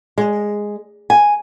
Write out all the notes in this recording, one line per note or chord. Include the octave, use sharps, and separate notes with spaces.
G#3
G#5